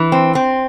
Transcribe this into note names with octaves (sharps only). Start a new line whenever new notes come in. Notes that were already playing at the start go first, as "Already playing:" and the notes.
Already playing: E3
C4
C4